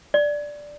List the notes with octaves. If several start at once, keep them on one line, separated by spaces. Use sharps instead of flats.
D5